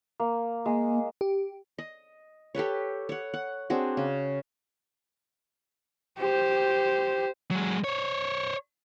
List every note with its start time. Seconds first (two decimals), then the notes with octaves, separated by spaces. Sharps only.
0.20 A#3
0.66 G#3 A#3
1.21 G4
1.78 D#5
2.55 G4 A4 B4 C#5
3.09 C#5 F#5
3.34 F#5
3.70 C4 D4 F#4 G#4
3.97 C#3
6.19 G4 C5
7.51 F#3 G#3
7.84 C5 C#5